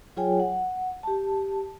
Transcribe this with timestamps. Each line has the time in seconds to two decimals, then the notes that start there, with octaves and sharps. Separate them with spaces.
0.17 F#3 F4 G#4 C#5 G5 G#5
0.40 F#5
1.03 G4 A5